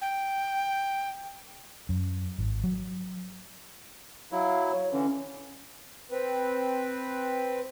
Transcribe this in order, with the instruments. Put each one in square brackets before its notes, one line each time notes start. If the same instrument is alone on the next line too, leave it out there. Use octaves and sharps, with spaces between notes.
[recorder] G5
[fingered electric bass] F#2
G#1
F#3
[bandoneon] F#3 E4 [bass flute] F5
[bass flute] C#5
[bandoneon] D3 E3 [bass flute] C#4
[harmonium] C4 B4